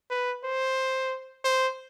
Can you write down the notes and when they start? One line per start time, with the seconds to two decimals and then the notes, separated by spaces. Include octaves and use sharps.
0.11 B4
0.44 C5
1.44 C5